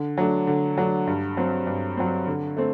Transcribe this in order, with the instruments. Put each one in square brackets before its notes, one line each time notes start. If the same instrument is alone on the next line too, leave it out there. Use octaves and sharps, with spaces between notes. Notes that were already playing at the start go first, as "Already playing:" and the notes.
Already playing: [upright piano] D3
F#3 A3 D4
D3
F#3 A3 D4
G2
F#3 C4
G2
F#3 C4
D3
A3 C4